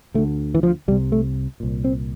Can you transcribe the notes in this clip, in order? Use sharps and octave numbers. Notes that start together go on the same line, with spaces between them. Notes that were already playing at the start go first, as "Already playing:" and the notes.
D2 D3 A3
E3
F3
C2 C3 G3
A3
C2 A#2
C4